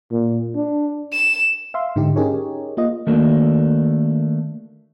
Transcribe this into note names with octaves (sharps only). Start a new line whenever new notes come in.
A#2
D4
E7
E5 F5 C6
G#2 D3 D#4 G4
C#4 D#4 G4 G#4 A#4 C#5
A#3 F4 D#5
D#3 A3 A#3 D4 F#4 A#4